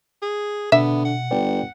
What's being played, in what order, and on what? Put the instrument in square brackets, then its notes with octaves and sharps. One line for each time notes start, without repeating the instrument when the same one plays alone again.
[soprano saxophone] G#4
[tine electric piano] B2 [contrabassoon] D3 [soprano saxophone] B3 [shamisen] E5
[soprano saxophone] F#5
[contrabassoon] G1 [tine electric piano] B4 D5 G5